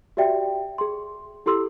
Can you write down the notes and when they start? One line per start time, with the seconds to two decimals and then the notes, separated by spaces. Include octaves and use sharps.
0.17 F#4 G4 D5 E5 G5
0.78 G#4 C6
1.46 E4 G4 A4 C6 E6